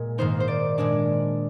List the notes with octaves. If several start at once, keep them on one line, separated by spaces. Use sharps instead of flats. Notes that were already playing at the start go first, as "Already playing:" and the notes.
Already playing: A#2 G#3
G#2 D#3 A#3 D#4 C5
C5
D5
A#2 G#3 D4 D5